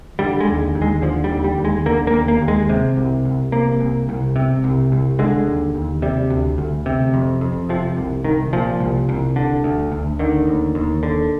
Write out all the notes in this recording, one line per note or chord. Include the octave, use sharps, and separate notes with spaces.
D3 G3
G#3
D#2
D#2
G#3
D3 F3
G3
D#2
G3
D#2
G#3
D3 A#3
A#3
D#2
A#3
D#2
G#3
C3
C2
C2
C3 A#3
C2
C2
C3
C2
C2
D3 G#3
D#2
D#2
C3 G3
D2
D2
C3
F2
F2
C3 F3
C2
C2 D#3
A#2 F3
C2
C2
D3
D2
D2
D3 D#3
D#2
D#2
D3